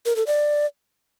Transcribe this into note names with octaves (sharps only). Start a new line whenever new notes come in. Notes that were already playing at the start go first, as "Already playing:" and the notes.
A#4
A4
D5